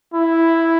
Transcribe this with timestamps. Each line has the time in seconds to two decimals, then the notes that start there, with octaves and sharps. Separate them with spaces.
0.14 E4